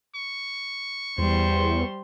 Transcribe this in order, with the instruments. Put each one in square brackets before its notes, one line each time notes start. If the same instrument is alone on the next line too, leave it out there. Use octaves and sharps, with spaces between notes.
[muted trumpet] C#6
[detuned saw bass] E2 [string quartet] G3 C5 C6